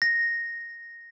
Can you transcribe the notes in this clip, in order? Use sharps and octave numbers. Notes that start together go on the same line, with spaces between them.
A#6